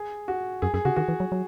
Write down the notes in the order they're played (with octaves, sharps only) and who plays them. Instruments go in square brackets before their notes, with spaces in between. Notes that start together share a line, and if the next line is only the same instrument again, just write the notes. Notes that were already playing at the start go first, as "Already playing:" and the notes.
Already playing: [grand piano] G#4
F#4
[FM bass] F#2 [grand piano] G#4
[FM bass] F#2 [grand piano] G#4
[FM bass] C#3 [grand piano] F#4
[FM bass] D#3 [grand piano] F#4
[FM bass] E3
F#3
F#3